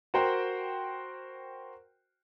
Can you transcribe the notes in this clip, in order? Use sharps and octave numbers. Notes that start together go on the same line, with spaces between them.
F#4 A#4 C5 G5